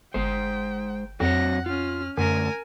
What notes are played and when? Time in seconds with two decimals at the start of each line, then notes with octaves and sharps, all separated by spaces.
0.14 G1 G#3 C5 G5
1.20 F2 F#3 C4 C#5 F#5 A#6
1.66 C#4 F4 F6
2.17 F#2 D3 A3 C#4 A#4 G#5